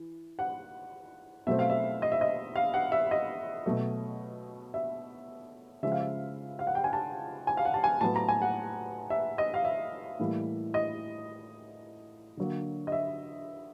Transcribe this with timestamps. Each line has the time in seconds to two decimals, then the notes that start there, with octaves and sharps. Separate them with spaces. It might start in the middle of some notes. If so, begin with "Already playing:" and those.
Already playing: E3
0.39 F#5
1.47 B2 F#3 A3 C4 E5
1.59 F5
1.70 E5
2.02 D#5
2.12 E5
2.21 D#5
2.56 F5
2.74 F#5
2.92 E5
3.11 D#5
3.66 B2 F#3 A3
4.74 E5
5.83 C#3 F3 G#3 E5
5.92 F5
6.00 E5
6.59 F5
6.67 F#5
6.75 G5
6.84 G#5
6.93 A5
7.47 G#5
7.57 F5
7.65 F#5
7.74 A5
7.84 G#5
8.01 A2 F#3 B3 A5
8.16 A#5
8.29 G#5
8.42 F#5
9.10 E5
9.38 D#5
9.54 F5
9.65 E5
10.19 A2 E3 G3 A#3
10.74 D#5
12.37 D3 F#3 A#3
12.87 D#5
12.92 E5